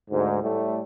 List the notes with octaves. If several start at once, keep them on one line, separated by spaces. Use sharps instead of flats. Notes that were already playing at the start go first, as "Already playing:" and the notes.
D2 G#2
A2 G3 A3